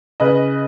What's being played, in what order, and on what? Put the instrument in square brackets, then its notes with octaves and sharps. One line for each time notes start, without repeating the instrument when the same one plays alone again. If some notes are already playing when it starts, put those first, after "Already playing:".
[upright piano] C#3 B4 D#5